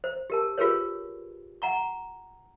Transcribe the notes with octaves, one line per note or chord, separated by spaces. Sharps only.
C5
G4 A#4 A5
F4 G4 G#4 A#4 B4 C#5
F#5 A#5 C#6